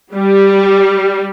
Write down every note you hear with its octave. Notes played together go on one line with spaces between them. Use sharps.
G3